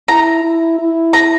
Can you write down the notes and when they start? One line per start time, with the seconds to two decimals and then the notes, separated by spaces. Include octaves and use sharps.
0.08 E4 A#5
0.43 E4
0.79 E4
1.13 A#5